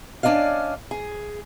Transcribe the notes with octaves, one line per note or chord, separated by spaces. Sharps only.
C#4 D4 D5 D#5 F5
G#4